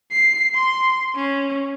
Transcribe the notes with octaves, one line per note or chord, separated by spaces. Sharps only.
C7
C6
C#4